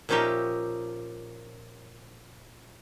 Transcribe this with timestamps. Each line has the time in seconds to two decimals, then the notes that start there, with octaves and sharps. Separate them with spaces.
0.09 A#2 F3 C#4 D#4 G4 E5